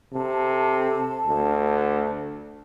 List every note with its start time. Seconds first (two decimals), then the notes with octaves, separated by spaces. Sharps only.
0.13 C3 A4 A5
1.26 D2